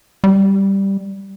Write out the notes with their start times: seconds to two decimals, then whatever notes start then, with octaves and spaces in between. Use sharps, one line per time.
0.24 G3